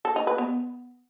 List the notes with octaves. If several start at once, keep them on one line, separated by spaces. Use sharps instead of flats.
A4
D#4
B4
B3